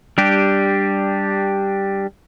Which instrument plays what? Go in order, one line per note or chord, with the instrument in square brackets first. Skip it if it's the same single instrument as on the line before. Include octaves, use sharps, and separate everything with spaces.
[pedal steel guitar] G3 D4 G4